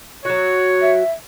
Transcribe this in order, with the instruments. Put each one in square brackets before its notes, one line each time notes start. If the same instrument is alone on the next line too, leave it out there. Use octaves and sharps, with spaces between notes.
[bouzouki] F#3 F#4 [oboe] C#5
[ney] E5